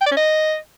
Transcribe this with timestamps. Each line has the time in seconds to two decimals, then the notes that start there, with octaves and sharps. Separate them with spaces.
0.01 G5
0.06 D5
0.11 C#4
0.17 D#5